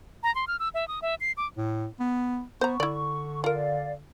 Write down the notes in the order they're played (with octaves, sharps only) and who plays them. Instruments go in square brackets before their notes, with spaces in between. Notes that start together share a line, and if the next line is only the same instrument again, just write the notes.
[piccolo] A#5
C6
F6
E6
E5
D#6
E5
C7
D6
[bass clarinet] A2
B3
[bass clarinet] B3 [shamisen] C5 A#5 [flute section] C#6
[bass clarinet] D3 [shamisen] E4 D5
[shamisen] F4 A#4 [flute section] D5 F5